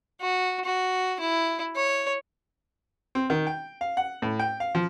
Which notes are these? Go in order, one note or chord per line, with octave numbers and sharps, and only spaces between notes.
F#4
F#4
E4
C#5
C4
D#3
G5
F5
F#5
A2
G5
F5
F3